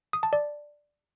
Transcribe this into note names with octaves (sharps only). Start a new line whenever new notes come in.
D#6
A5
D5